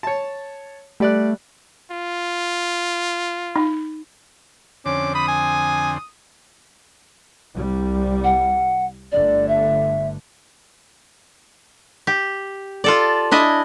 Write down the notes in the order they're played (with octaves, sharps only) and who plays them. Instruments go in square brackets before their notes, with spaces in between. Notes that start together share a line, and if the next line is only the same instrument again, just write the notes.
[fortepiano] C#5 A5
[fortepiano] G3 D5 F#6 [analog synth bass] A3
[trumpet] F4
[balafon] D#4
[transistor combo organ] F2 D3 C4 [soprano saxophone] C#4 [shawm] D6
[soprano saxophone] B5 [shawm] D#6
[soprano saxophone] G#5
[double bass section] C2 G3
[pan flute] F#5
[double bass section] G1 D3 A3 [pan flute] D5
[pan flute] E5
[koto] G4
F4 A4 D5
D4 E4 D#5 G#5